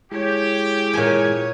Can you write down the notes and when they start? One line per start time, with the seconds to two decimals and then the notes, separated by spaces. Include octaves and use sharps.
0.11 G#3 E4 G4 G#4 C#5
0.94 A#2 C#5 G#5